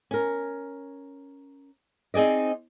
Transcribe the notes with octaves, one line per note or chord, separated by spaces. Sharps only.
C#4 A#4
C4 D#4 G#4 D5 D#5